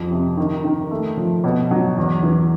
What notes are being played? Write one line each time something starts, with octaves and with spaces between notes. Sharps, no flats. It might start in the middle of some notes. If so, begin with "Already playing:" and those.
Already playing: F2 F3
C3
D#3
D#3
A3
F3
B2
F#3
E2
E3